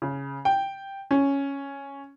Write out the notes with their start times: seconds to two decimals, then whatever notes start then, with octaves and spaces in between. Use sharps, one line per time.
0.02 C#3
0.45 G5
1.11 C#4